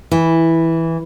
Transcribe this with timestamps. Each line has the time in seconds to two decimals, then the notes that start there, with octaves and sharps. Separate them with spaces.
0.11 E3